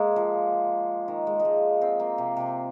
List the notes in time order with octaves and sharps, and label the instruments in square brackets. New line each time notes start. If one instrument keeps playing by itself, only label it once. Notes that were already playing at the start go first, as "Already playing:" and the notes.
Already playing: [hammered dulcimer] G#3 A#3
F3
D#3
G#3
G#3
F3
C4
A#3
C3
C3